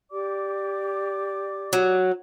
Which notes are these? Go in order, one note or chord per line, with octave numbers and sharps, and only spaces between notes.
G4 D5 D6
F#3